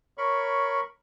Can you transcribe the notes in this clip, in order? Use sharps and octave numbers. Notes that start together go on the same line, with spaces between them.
A#4 C#5 B5 C#6